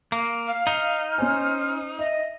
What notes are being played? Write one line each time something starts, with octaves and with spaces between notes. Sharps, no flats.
A#3
F5 F6
D#4 G7
C#4 C5 C#5 G#5
D#5 E5